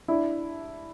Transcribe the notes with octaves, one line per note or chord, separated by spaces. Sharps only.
D4 E4